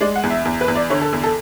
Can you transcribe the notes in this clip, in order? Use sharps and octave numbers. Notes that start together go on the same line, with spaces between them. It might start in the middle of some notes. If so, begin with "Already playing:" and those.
G#3 D5
F#5
E2
E5
E2
B4
E2
D5
D3 C#5
A4
E2
A4